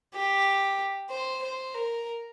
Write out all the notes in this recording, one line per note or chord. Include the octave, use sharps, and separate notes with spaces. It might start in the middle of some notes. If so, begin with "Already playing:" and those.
G4
C5
C5
A#4